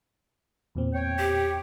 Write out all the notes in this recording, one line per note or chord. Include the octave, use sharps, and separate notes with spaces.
E2 A#2 C4
C#5 G5
G4